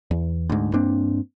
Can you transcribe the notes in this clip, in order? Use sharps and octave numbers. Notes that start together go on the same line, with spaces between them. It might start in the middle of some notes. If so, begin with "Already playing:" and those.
E2
D2 G#2
G2 A#3 C4 D4